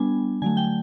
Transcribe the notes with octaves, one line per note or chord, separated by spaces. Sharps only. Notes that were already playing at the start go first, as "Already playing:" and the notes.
Already playing: G3 B3 D4 G#5
D3 F#3 A3 G#5
G5